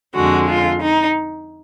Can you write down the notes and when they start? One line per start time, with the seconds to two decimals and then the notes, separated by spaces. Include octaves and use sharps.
0.16 F2 D3 G#3 F#4
0.50 F4
0.83 D#4